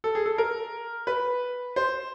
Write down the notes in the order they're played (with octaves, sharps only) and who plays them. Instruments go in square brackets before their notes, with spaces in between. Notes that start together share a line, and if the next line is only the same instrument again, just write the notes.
[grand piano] A4
G#4
A4
A#4
B4
C5